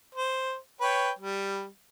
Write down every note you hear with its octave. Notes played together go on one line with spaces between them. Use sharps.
C5
B4 C#5 G5
G3